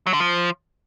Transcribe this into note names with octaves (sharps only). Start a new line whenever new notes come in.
F#3
D3
F3